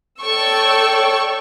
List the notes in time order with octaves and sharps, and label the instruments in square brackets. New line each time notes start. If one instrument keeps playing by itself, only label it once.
[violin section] A4 C#5 D5 G5 C#6 E6